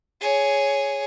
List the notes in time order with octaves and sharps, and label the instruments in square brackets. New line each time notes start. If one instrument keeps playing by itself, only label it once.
[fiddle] G#4 C#5